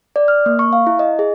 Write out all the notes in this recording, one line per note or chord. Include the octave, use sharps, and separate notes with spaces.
D5
F6
A#3
C#6
F5
E4
D#5
G#4